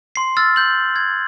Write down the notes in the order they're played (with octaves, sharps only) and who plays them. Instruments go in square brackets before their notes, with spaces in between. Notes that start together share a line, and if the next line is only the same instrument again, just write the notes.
[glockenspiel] C6 C7
E6 F6 A6
G6 F#7
G#6